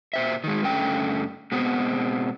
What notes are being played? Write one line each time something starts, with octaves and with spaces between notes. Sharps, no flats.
A#2 C5 E5
D#3 G#3
G2 D3 A3 C#4 G5
B2 G#3 B3 C4